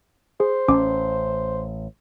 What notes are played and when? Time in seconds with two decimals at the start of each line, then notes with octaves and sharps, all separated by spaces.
0.40 G#4 C5
0.68 A1 C#4 D6